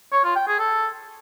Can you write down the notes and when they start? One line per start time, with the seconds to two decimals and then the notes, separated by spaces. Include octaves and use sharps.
0.12 C#5
0.24 F4
0.36 G5
0.48 G#4
0.59 A4